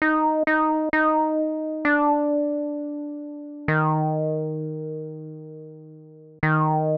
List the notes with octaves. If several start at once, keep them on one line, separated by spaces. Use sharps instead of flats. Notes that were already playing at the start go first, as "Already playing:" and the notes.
D#4
D#4
D#4
D4
D#3
D#3